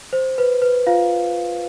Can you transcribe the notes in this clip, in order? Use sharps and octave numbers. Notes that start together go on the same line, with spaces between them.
C5
B4
B4
F4 F5